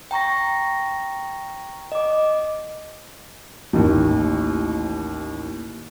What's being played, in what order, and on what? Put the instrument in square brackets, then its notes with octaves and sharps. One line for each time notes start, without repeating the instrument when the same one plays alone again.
[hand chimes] G5 A#5 C#6 A#6
D#5 D6
[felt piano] A1 D#2